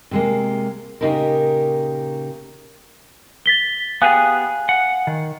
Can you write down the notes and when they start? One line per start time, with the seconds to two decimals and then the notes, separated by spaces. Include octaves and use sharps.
0.11 C3 G#3 A#3
1.01 A#2 C#3 D#4 G4 A#4
3.46 A6 B6 G7
4.02 B3 G4 G#4 F5 G#5 F#6
4.69 F#5
5.07 D#3